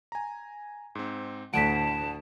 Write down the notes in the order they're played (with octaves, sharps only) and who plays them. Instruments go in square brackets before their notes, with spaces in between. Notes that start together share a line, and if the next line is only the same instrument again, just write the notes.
[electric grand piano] G#5 A#5
G#2 C4
[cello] D2 [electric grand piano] A2 F#5 [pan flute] A5 [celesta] B6 D7